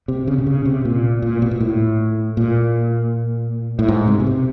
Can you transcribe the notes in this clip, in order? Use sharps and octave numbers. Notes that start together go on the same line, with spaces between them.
C3
C#3
C3
C#3
C3
A#2
A#2
B2
A#2
A2
A#2
A2
G#2
C3
B2
C3